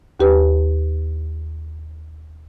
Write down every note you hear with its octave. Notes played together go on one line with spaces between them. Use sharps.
D#2 G4 B4